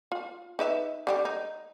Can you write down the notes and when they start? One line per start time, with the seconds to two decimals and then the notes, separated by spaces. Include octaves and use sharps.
0.12 F4
0.59 D#4 B4 E5
1.07 D3 G3 G4
1.25 D#4